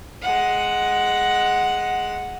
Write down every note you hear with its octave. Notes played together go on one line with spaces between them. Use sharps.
G#3 F#5